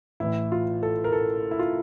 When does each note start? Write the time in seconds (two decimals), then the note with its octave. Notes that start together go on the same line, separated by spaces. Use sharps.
0.20 A1 A2 E3 E4
0.52 F4
0.83 A4
1.04 A#4
1.12 A4
1.51 E4
1.59 F4